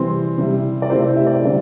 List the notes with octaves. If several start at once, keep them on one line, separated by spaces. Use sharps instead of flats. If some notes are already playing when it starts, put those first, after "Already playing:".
Already playing: C3 E3 G3 C4 C6
C3 G3 E4
D5
C3 A3 C4 E4 C5
E5
D5
C5
D3 G3 C4 D5